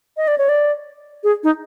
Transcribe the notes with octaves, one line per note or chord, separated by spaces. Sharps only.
D#5
D5
C#5
D5
G#4
D#4